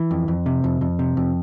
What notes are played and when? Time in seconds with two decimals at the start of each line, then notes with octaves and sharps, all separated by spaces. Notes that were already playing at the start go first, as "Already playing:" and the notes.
Already playing: E3
0.11 F2
0.28 F2
0.46 C3
0.64 F2
0.81 F2
0.99 C3
1.17 F2